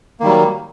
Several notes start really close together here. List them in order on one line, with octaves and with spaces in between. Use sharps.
A#3 D#3 G3 F#3